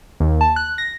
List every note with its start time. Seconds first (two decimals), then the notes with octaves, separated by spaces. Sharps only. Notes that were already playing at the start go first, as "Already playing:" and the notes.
0.20 D#2
0.41 A5
0.56 F#6
0.78 A#6